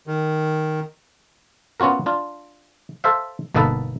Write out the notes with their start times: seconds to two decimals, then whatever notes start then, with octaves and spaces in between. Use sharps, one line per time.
0.07 D#3
1.80 B3 C#4 F4 F#4 A#4
2.06 D4 F4
3.04 A4 C5 E5 F5
3.54 G1 B2 A#3 D#4 A4 B4